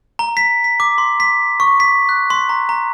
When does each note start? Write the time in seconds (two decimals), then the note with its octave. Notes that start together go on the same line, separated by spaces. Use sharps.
0.19 A#5
0.37 B6
0.64 B6
0.80 D6
0.98 C6
1.20 B6
1.60 C#6
1.80 B6
2.09 F#6
2.30 C6
2.49 A#5
2.69 A#5